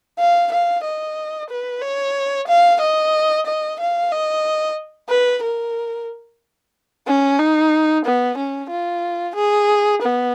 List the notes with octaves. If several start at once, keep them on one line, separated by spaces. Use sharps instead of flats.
F5
F5
D#5
B4
C#5
F5
D#5
D#5
F5
D#5
B4
A#4
C#4
D#4
B3
C#4
F4
G#4
B3